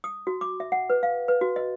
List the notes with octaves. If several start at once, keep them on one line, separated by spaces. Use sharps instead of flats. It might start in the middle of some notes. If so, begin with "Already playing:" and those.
D#6
F#4
D6
E5
F#5
B4
F5
B4
F#4
D#5